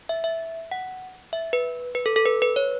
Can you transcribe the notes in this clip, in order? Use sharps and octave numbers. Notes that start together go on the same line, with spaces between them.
E5
E5
F#5
E5
B4
B4
A4
A4
B4
B4
C#5